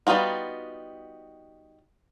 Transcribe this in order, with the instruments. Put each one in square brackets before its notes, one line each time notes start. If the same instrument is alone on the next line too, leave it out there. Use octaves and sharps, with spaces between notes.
[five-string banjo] G3 B3 D#4 F4 F#4